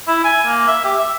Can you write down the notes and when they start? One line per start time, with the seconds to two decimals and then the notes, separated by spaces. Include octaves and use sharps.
0.08 E4
0.24 G#5
0.47 A#3
0.67 E5
0.84 G4
0.98 E5